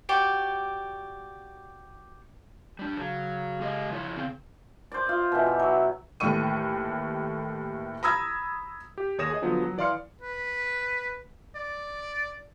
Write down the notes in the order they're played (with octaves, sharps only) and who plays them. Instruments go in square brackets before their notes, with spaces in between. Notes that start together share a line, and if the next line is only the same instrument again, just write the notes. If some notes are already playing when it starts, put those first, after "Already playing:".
[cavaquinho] F#4 G4 D5
[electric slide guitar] G3 D4
[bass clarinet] C#3 [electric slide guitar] F#3
[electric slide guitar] G#3 G4 D#5
F3 E4 C#5
[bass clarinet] C#3 [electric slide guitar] C4 C#4
[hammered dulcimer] C5 D5
F4 D#5
B2 E3
G4
F#3
[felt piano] D#2 A2 E3 A3 C#6 D#7
A#5 B5 D#6 E6 G#6
[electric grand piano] G4
D#2 G#4 C#5 D#6 A#6 E7
G#4 D#5
D3 F3 F#3 B3
F#3
E3 D5 F5 C6 F6 C#7
[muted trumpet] B4
D5